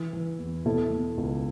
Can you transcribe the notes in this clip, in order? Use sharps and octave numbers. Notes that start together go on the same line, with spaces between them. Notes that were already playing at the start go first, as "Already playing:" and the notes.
Already playing: E3 E4
E3
E2
B2 E4 A4
B2
C#2